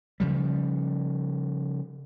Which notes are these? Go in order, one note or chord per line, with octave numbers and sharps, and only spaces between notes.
C#3 F3 G3